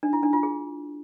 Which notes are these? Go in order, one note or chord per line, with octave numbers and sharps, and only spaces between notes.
D4
E4
D4
F4
G#4